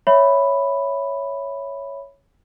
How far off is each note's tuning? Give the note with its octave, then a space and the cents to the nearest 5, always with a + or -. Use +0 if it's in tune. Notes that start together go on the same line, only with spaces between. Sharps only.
C#5 +0 E5 +0 B5 +0